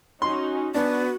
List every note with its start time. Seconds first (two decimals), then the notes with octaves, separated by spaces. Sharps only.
0.22 C#4 D#4 F#4 C6
0.74 B3 D4 F#4